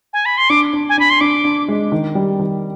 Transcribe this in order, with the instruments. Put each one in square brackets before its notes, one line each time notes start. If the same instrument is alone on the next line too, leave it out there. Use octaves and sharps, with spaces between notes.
[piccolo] G#5
B5
C6
[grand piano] D4 [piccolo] D6
[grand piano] D4
[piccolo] G#5
[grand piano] D4 [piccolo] B5
[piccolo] C6
[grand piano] D4 [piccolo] D6
[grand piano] D4
G#3
D#3
G3
D#3